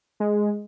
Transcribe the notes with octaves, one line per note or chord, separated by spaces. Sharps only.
G#3